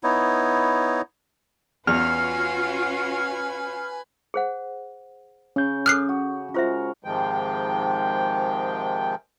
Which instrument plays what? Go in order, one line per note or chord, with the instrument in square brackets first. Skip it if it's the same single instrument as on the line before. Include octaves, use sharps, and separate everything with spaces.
[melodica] B3 D#4 E4 C#5
[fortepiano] E2 [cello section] C#4 F4 F#4 [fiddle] B4 G#5 [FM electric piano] F6
[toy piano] G#4 C5 F#5
[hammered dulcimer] C#3 [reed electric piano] C#4 G6
[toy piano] A4 D6 D#6 [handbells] F6 F#6 C7
[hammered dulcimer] F#4
[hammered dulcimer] G#3 F#4 A#4 [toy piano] F4 C5 E5
[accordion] G#2 C3 D#3 F3 G#3 G5